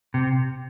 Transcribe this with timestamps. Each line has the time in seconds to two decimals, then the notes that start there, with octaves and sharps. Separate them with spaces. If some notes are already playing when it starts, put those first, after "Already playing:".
0.14 C3